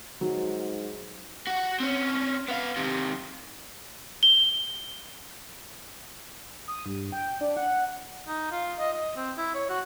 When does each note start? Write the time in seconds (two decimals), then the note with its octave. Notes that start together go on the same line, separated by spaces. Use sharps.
0.21 G#2 F#3
1.47 F#4 F#5
1.80 C4 C#4
2.48 B3 F5
2.76 D#2 C3
4.23 G7
6.68 D#6
6.86 G2
7.12 G5
7.41 D4
7.57 F#5
8.28 D#4
8.52 F4
8.79 D#5
8.94 D#5
9.16 C4
9.37 E4
9.54 C#5
9.69 F#4